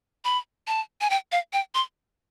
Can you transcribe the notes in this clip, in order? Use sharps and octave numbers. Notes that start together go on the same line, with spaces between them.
B5
A5
G#5
G5
F5
G5
C6